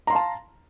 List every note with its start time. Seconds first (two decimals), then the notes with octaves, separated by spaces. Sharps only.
0.07 A#5
0.10 C6
0.12 F5
0.15 A5